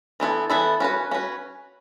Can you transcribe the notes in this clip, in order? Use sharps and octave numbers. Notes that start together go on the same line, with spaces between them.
E3 B3 E4 A4
E3 B3 E4 A4
C#4 F#4 B4
C#4 F#4 B4